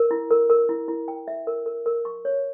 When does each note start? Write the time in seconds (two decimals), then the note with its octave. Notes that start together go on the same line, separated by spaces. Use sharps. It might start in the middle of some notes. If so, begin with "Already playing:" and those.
Already playing: A#4
0.11 E4
0.31 A#4
0.50 A#4
0.69 E4
0.88 E4
1.08 G5
1.28 E5
1.47 A#4
1.66 A#4
1.86 A#4
2.05 C#6
2.25 C#5